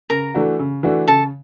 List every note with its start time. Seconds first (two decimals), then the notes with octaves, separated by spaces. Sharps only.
0.10 C#3 A#4 A#5
0.34 E3 A3 D4 F#4
0.59 C#3
0.83 E3 A3 D4 F#4
1.08 C#3 A4 A5